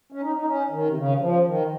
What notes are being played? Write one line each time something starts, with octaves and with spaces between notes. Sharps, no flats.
C#4
D#4
D#4
C#4
D#3
C3
C#3
F3
D#3